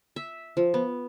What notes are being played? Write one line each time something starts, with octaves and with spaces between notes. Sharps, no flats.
E5
F3
B3